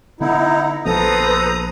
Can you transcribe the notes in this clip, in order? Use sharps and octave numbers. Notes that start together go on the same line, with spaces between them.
D3 B3 D#4 E4 F#5 A#5
A#1 F3 B3 A4 B4 C5 A#5 D#6